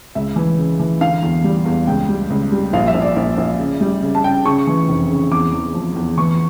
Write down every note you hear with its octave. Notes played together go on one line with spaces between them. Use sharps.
C#2 E5
E3
C#3
E3
D3 F5
E2
G3
E2
C#2 G5
G3
C#2
G3
A#1 F5
E5
A#1
D5
A#1
A#1
C#3
G3
C#3
A5
C#3 G5
C#3 C#6
E3
F1
C#3
E2 D6
E2
F3
E2
E3 C#6